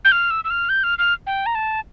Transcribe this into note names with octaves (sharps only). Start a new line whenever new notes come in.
G6
F6
E6
E6
F6
G6
F6
F6
G5
A#5
A5